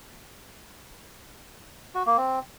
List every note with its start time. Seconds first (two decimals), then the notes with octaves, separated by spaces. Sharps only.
1.95 F#4
2.06 A#3
2.18 C4